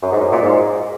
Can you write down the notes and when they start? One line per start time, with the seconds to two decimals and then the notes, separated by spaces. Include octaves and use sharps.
0.02 F#2
0.12 G#2
0.20 F#2
0.32 A#2
0.42 G#2